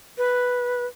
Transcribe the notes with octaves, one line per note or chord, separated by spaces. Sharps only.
B4